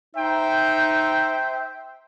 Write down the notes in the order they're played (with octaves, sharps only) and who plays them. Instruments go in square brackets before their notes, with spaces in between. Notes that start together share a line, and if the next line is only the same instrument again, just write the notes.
[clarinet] D#4 [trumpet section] C5 E5 G5